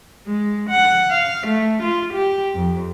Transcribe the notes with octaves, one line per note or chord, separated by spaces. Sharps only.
G#3
F#5
F5
A3
F4
G4
F2